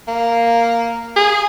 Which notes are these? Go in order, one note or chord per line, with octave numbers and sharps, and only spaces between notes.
A#3
G#4